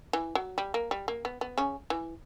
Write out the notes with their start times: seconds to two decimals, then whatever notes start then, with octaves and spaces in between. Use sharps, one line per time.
0.13 E3
0.35 F#3
0.58 G3
0.74 A#3
0.91 G3
1.08 A#3
1.25 B3
1.41 B3
1.58 C#3 C#4
1.90 E3